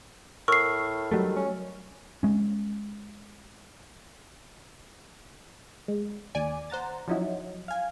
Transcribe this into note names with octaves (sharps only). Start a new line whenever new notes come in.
A2 A#4 C#6 E6 F6 C7
D#3 F#3 G3 A3
C#4
G#3 C#4
G#3
D#2 D5 G#5
C5 F#5 A#5 A6
F3 F#3 C#4 D#4 E4 F#4
F5 G#5